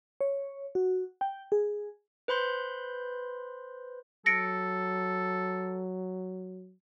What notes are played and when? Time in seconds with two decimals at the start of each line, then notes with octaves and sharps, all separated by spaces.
0.21 C#5
0.75 F#4
1.21 G5
1.52 G#4
2.28 B4 C5 B5 C6 G6
4.26 F#3 A4 A#6 C#7 D7